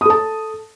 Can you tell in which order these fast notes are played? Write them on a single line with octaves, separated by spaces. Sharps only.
D#6 A4 A5